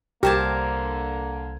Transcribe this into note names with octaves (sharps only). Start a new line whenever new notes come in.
C2 D3 A#3 G4 A#4 C5 A5 G#6